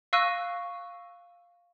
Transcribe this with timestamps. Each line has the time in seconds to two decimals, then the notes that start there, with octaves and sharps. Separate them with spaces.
0.13 F5 C#6 E6 F#6 A#6 D#7